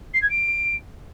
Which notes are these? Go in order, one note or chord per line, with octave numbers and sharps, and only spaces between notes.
C7
G#6
D7